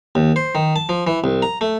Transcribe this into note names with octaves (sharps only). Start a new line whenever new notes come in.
D#2
C5
D#3
A5
F3
E3
C2
A#5
A3